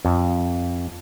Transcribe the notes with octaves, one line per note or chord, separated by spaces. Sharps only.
F2